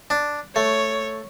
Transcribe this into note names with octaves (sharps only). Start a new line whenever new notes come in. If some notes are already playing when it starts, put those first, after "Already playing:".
D4
A3 C#5